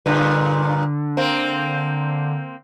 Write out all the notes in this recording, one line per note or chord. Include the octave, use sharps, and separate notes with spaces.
G2 A#2 D3 B4
A#3 C4